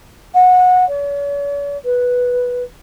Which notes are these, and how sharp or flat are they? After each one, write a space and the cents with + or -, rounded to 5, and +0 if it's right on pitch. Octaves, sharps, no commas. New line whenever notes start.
F#5 -20
C#5 +45
B4 -5